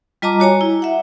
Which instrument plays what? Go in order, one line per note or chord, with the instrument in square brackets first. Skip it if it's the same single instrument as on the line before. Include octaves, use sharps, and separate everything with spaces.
[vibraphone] G3 F4 D#5 A5 A#5 D6
F#4 C#5 G#5 A#5
E4
E5 F#5